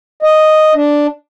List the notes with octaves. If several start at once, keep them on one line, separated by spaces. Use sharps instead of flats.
D#5
D4